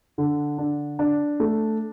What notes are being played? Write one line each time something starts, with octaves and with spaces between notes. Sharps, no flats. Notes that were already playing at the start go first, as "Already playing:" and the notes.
D3
D4
D4
A3